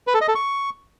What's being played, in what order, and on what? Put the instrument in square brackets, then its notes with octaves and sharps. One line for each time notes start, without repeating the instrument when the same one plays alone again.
[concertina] B4
A4
D#5
A4
C#6